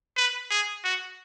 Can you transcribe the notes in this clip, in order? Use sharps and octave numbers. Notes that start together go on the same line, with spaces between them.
B4
G#4
F#4